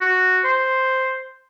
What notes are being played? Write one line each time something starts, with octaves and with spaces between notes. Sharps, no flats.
F#4
C5